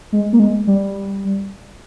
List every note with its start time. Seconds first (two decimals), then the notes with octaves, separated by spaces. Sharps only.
0.12 G#3
0.33 A#3
0.40 G#3
0.67 G3